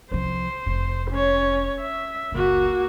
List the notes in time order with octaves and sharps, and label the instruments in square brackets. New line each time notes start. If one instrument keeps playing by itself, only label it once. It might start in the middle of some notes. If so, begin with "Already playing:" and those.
[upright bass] C2 F3 [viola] C5
[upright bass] F1
[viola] C#4 C#5
E5
[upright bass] F#1 C#2 [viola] A#3 F#4